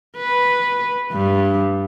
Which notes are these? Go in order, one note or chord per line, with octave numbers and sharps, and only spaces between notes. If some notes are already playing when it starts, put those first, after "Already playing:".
B4
G2